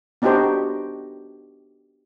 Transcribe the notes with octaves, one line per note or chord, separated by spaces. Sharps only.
B3 D4 D#4 F#4 G4 C5